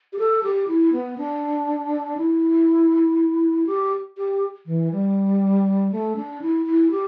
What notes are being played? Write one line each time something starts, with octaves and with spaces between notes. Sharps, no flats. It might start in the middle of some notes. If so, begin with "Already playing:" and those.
G4
A4
G4
E4
B3
D4
E4
G4
G4
E3
G3
A3
D4
E4
E4
G4